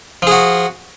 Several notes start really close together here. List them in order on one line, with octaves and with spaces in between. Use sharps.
F3 G#4 F#4